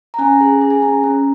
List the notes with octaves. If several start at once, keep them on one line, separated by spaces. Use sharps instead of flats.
A#5
C#4 G#5
G#4
G#4
G#5
C#4 A#5
C#4